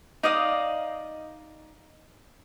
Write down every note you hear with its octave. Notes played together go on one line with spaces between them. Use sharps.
D#4 D5 D#5 F5